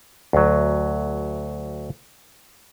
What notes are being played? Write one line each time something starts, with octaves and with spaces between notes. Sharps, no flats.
D2 F#3